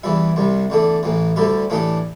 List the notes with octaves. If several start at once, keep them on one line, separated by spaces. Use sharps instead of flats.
E2 E3 G3 E4
C2 C3 G3
E2 D3 A3 D4
A1 A2 E3
D2 D3 G3 E4 G4
A2 E3 A3 D4 G4